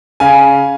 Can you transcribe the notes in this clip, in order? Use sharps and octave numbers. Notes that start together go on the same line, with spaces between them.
C#3 F5 G#5